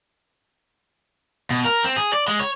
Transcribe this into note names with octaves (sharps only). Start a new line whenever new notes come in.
B2
A#4
C4
G#4
D5
G#3
C#5